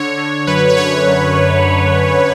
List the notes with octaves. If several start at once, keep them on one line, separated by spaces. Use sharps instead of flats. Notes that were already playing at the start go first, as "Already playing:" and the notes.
Already playing: D3 C#5
D3
F#2 B4
B4
F#2 C#5
F#2